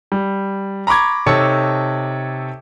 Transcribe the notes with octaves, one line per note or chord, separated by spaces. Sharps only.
G3
A#5 B5 C#6 D6 G#6
C3 D#4 A4 C#5 A5 C#7